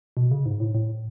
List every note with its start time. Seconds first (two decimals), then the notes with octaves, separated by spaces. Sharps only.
0.17 B2
0.31 C#3
0.46 G#2
0.60 A2
0.75 A2